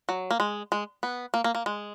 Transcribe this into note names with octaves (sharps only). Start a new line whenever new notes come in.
F#3
A#3
G#3
G#3
B3
A#3
A#3
A#3
G#3